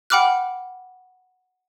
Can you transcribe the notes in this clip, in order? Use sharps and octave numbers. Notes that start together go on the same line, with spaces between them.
F#5 G5 B5 D6 F6 F#6